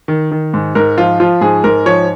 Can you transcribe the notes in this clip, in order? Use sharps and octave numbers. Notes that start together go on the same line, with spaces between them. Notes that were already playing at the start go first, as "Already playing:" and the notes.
D#3
D#3
G#2
G#2 A#4
F3 F4
F3 F4
G#2 G#4
G#2 A#4
F3 C#5